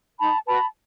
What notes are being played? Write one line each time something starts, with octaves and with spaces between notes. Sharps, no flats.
D#4 A5 B5
F#4 B4 A5 B5